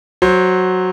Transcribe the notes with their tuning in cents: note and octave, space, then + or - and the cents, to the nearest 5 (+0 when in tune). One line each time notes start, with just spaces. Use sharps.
F#3 +0 C5 +15